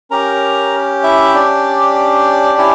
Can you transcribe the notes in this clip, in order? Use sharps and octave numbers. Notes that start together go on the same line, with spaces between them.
C#4 G4 A#4 A#5
E4 E5
D4 D5
C#4 E4 G4